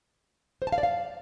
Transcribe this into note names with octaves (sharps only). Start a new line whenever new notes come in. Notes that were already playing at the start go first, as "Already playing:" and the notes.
C5
A5
F5
D5
F5